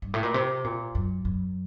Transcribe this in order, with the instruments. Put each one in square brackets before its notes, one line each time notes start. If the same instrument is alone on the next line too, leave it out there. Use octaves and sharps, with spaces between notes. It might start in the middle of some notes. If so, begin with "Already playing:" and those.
[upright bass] G2
A2
A#2
C3
A#2
F#2
F#2